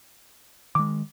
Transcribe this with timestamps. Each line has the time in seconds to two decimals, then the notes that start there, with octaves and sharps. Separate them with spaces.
0.75 D#3 G#3 D6